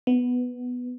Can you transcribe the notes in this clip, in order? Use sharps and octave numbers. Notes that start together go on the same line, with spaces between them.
B3